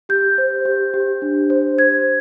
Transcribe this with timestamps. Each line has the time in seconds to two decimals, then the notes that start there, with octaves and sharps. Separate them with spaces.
0.09 G4 G6
0.38 C5
0.65 G4
0.94 G4
1.22 D4
1.50 C5
1.78 C5 G#6